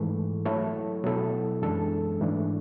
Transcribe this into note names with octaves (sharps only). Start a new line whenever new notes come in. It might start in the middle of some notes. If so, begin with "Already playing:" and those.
Already playing: G#2 E3 A3
F#3 A3 E4 A4 C#5
B2 F#3 B3 E4 A4
F#2 E3 G#3 D4 A4
G#2 E3 A3 D4